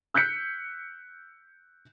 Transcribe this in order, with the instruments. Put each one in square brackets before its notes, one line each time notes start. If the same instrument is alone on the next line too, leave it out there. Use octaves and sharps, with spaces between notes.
[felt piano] E6 F#6 G6 B6 C#7